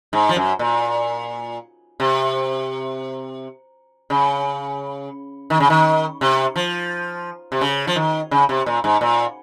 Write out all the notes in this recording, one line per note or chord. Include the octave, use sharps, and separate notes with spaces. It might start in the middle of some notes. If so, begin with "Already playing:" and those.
G#2
F3
F#2
A#2
C3
C#3
D#3
C#3
D#3
C3
F3
C3
C#3
F3
D#3
C#3
C3
A#2
G#2
A#2